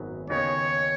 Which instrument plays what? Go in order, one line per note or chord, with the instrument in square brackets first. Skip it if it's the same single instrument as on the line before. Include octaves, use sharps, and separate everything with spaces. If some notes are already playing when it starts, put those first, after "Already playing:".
Already playing: [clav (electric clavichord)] G#1 F#2 F#3 B3 D#4
[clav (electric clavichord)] D#2 C#3 B3 D#4 [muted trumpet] C#5